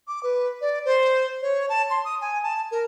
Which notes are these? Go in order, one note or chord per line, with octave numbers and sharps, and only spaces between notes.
D6
B4
D5
C5
C#5
A5
C6
D#6
G#5
A5
A#4